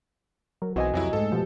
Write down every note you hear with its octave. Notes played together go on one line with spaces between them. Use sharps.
F#3 A#4
B1 E3 C4 F#4 D#5 G#5
F2 C3 F#3 E4
G#2 G#3 A3 A4
B2 F3 G4